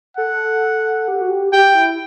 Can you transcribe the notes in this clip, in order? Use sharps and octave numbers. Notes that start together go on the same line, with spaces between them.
A4 F#5
G4
F#4
G4
G4 G5
E4